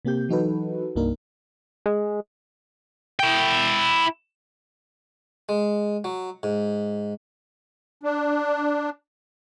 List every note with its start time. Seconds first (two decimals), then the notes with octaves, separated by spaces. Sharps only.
0.05 C3 A#3 C4 G4 G6
0.29 E3 F#3 D#4 F#4 A4 B4
0.96 C2 G2 A#3 D4 D#4 A#4
1.86 G#3
3.20 E4 G5
5.49 G#3
6.04 F#3
6.43 G#2
8.03 D4